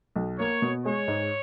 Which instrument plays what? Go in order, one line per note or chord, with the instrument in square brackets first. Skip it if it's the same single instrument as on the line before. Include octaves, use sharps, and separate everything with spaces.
[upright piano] B1
[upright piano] A#3 [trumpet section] C#5
[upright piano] B2
[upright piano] G#3 [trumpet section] C#5
[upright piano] G#2